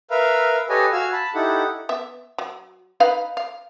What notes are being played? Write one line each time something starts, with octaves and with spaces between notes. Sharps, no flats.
A#4 B4 E5 F5
G4 A4 B4 C#5 D#5 G#5
F#4 F5 G#5 E6
A5 B5
D#4 E4 G4 A4 F#5
B3 E5
F#3
D#4 B4 F5
F5